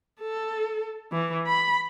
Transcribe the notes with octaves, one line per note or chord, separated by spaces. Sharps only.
A4
E3
B5